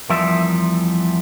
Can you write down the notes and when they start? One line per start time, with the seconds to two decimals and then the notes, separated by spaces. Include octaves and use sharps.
0.10 E2 F3 G3 A#4 E5